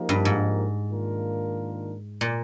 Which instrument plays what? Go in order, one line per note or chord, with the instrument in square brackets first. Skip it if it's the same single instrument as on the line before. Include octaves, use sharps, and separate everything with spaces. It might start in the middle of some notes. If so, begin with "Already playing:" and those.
Already playing: [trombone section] F3 A#3 D#4 G4 A#4
[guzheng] G2
G#2
[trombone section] D#3 A#3 D4 F4 A#4
[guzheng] A#2